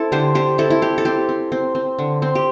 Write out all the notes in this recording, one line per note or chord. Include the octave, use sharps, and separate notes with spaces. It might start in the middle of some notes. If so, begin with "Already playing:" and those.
Already playing: C4 E4 A4
D3 G4 C5
D3 G4 C5
C4 E4 A4
E4
C4 G4
A4
C4 G4
C4
C4
C4
D3
C4
G4